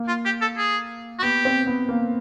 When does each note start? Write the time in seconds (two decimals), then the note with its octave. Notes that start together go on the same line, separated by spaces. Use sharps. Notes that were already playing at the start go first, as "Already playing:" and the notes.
Already playing: A#3
0.08 F4
0.25 G4
0.41 A4
0.58 G#4
1.19 F#4
1.23 B3 G4
1.45 C4
1.67 B3
1.89 A#3